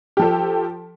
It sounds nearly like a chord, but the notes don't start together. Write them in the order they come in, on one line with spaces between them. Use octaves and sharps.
G4 F3 A4